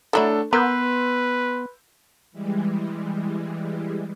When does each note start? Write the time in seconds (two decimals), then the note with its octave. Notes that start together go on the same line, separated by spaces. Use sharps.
0.13 D3 F#3 A3 D4 E4 A4
0.53 B3 A#4 B4 C6 E6 G6
2.31 E3 G3 G#3